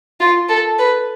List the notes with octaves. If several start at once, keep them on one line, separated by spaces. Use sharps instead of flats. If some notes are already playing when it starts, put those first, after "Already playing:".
F4
A4
B4